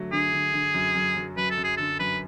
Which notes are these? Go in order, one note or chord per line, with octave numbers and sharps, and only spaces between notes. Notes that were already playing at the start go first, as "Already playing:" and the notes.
Already playing: D3 F#3 A3
D3 G#4
D3
D3
F#2
F#2
F#3
F#2 B4
A4
F#2
G#4
D3 A4
F#2 B4